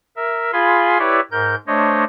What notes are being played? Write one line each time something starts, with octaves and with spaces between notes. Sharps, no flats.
A#4 E5
F4 G#4 F5 G#5 B5 C6
E4 G4 B4 C#5 D5 E5
G#2 A#4 G6
A3 D4 C5 C#5 D#5